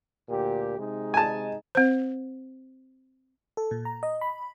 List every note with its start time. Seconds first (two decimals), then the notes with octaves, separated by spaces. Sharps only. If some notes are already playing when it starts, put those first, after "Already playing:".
0.29 D2 A#2 G4
0.79 C3 G#3 D#4
1.14 G#5 A5
1.75 C4 C5
3.57 A4
3.71 A#2
3.85 A#5
4.03 D#5
4.21 B5